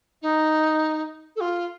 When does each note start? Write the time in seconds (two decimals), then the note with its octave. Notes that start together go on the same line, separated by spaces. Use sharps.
0.22 D#4
1.36 A4
1.40 F4